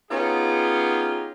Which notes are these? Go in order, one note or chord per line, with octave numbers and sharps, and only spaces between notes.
B3 C#4 D#4 F4 G4 G#4